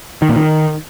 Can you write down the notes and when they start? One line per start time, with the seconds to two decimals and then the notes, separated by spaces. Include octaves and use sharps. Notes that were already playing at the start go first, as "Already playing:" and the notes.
0.22 D#3
0.29 A#2
0.36 D#3